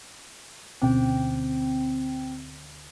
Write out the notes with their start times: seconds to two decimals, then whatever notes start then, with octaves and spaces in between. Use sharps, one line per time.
0.82 D2 B2 C4 C#4 G5